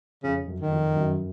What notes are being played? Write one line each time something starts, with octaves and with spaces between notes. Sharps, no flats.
F2 C#3
F#2
D#3
F2
F#2